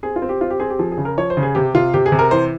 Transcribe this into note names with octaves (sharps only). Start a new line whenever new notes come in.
C4 G#4
F4
C4
G4
C4 F4
G4
C4 G#4
G4
F3 G#4
G#4
C#3
A#4
F3 C#5
C5
C#3
G#4
C3 G4
C3 F4
C3 G4
G#4
C3
A#4
E3 C5